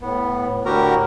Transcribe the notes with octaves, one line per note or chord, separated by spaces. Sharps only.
A2 B3
A2 D3 F#4 G4 A#4 A#5